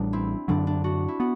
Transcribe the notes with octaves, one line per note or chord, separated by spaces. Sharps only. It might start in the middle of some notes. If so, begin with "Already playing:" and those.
Already playing: A1 A2 G3 D4 F#4
C4 E4
F#2 D3 F#3 D4
D4
D4 F#4
E4
B3 F#4